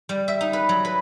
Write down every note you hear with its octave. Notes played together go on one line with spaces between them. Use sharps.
G3
E5
D#4
B4
F#3
B4